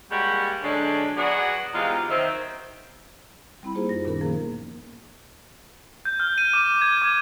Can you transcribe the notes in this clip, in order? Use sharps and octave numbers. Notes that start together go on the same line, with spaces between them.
G3 G#3 A#3 F#4 G4
D3 F#3 G#3 C#4 D4
F#3 B3 F#4 G#4 D5
E2 C3 G#3 D#4 F4
D#3 F#3 C4 D#4 C5 E5
G3 C4 E4 B5
A#3 D#4 F4 G4 G#4 C5
F#2 D#4 A#6
A#2 D#3 B3 C#4 A#4
D#3 F3 A#3 G#4
G6
F6
D#7
D6
G#6
D6